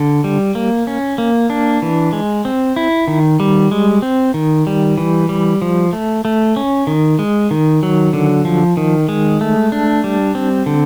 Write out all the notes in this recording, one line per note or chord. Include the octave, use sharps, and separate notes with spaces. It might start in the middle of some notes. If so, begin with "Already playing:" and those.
Already playing: D3
G3
A#3
C#4
A#3
D4
E3
G#3
C4
E4
D#3
G3
G#3
C4
D#3
G3
E3
G3
F3
A3
A3
C#4
D#3
G#3
D#3
F#3
D3
F3
D#3
G#3
A3
D4
G3
C4
D3